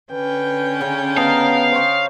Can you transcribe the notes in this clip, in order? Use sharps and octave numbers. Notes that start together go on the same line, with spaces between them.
D3 C#4 B4 G5
C#3 G#5
B3 D#5 F5 A5 A#5
C5 C#5